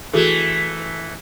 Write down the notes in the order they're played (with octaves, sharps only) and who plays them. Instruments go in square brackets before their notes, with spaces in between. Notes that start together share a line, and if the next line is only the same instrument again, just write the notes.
[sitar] E3 A3 [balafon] F#4 G#4 A4